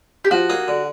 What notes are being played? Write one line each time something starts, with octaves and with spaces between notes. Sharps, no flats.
G4
F3 F#4
A#3 D#4 G#4
D3